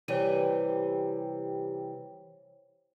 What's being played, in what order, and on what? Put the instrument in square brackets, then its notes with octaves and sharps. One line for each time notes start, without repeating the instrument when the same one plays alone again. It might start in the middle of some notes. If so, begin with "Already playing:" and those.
[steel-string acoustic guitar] C3 E3 G3 [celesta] C5 C#5 D#7